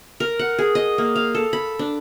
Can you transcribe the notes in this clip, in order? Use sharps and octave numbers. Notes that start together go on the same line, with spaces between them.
A#4
F#5
G#4
D#5
A#3
F5
A4
B5
D4